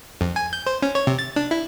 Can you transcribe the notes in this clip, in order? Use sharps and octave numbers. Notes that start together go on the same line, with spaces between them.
F2
G#5
G6
C5
C#4
C#5
C3
A6
D4
E4